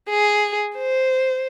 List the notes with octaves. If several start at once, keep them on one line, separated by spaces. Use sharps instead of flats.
G#4
C5